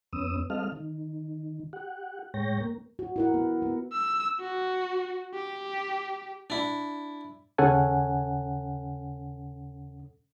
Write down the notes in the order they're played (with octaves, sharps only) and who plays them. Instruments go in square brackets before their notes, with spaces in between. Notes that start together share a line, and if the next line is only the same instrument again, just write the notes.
[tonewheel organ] F2 B3 C#4 D#6 E6
G3 C4 A4 D#5 F5 F6
D#3
G4 F#5
A2 G#3 C#5 G5 A#6
A#3
[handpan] F#4
E4 A#4 F#5
B3
B3
[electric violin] E6
F#4
G4
[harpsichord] D4 E4
[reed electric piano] D#2 C#3 C#4 A4 F#5 G#5